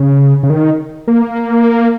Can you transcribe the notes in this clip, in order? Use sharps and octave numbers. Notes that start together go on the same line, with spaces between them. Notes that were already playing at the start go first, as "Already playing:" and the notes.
Already playing: C#3
C#3
D#3
A#3